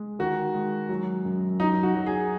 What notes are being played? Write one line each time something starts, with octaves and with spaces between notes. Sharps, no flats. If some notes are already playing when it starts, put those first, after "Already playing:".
Already playing: G#3
D#3 F#4
G#3
F#3
F#2
F#3 D#4
F#4
F#3
G#4